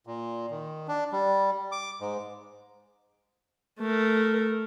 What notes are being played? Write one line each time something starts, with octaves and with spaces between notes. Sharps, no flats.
A#2
D#3
D4
G3
D6
G#2
A3 A#4